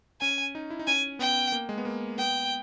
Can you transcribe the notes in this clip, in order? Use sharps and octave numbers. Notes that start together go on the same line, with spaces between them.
C#4 G#5
D#4
E4
D#4
C#4 G#5
B3 G5
A#3
G#3
B3
A#3
B3 G5